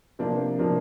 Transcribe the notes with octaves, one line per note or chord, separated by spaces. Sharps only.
C3 F3 A#3 D4
C3 F3 A#3 D4